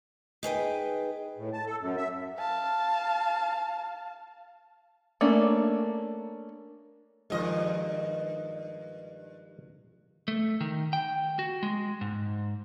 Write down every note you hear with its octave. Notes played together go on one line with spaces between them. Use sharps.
D#4 G#4 B4 G5
A2
A5
A4
F#2
E5
F5 A5
A3 A#3 C#4 D4
G2 D#3 F3 G#3 D#5
A3
D#3
G5
F#4
G#3
G#2